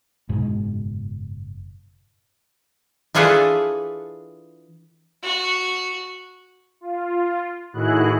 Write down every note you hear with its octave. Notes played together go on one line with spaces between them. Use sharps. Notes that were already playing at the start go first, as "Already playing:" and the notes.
F#1 G#2 B2 G#3
E3 D4 F4 G#4 A4 B4
F#4
F4
A2 D#3 E4 F#4 G#4 F#6